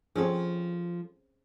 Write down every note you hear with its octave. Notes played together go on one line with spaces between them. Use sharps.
F3 C4 C#4 G#4 A4